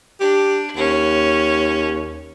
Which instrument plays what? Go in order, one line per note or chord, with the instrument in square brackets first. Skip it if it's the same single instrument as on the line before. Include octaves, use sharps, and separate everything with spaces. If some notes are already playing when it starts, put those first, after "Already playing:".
[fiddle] D4 [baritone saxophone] G4
[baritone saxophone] D#2 [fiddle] C#4